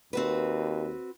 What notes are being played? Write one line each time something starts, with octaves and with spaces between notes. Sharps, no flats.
D#2 C4 F#4 B4